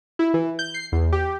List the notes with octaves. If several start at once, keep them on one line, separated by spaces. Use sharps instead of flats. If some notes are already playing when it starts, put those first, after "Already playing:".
E4
E3
G6
C7
E2
G4